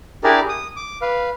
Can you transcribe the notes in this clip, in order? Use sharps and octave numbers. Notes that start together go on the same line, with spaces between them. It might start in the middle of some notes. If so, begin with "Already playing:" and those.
D4 E4 G4 G#4 A#4 D5
D#6
D6
B4 F5